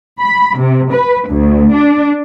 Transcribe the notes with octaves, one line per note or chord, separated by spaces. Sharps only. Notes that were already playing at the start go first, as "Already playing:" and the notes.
B5
C3
B4
D2
D4